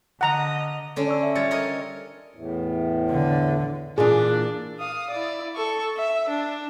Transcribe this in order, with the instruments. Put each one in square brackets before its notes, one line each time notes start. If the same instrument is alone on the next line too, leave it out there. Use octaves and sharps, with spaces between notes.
[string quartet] D3 D#5 [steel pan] F#5 A#5
[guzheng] D3 C#4 D4
[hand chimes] D5 C#6 E6
E5
[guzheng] G3 F4 [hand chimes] G#6 A6 C#7
[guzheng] A#4 C#5 D#5
[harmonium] E2 A2
[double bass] D3
[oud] A#2 E3 F4 [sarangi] D4 [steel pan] G#4
[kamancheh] F5 D#6
E4 D5
A4 C#6
E5
D4